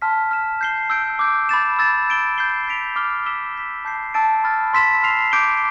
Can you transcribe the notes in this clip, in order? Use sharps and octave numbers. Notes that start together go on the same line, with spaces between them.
A5 C6 F6 B6
F6 B6 E7
G6 C7 G7
E6 G6 D7
D6 G6 D7
B5 D6 A6 E7
E6 A6 E7
G6 D7 G7
G6 C7 G7
G6 B6 D7 F7
D6 F6 C7 G7
E6 B6 E7 G7
E6 G6 B6
A5 D6 G6 C7
A5 E6 A6 D7
B5 F6 A6
C6 E6 B6 E7
C6 F6 C7 F7
D6 G6 D7 G7